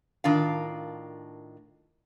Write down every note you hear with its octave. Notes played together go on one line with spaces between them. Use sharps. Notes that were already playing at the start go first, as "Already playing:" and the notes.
A2 D#3 D4 F4 A#4 F5